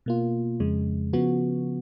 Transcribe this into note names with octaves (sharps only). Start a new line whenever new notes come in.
B2 A#3 F4
F2 C#3 G#3
C#3 F3 B3 F#4